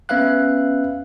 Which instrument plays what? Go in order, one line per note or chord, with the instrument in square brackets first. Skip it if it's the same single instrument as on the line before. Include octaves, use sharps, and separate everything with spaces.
[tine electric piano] B3 C#4 B4 E5 F5 F#6